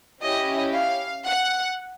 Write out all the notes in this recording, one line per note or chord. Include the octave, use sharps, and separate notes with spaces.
C#4 E4 G4 D#5
F5
F#5